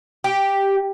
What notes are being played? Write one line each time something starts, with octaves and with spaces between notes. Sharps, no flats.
G4